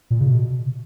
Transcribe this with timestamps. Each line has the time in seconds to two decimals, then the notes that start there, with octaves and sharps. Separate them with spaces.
0.10 A#2
0.21 C#3
0.28 B2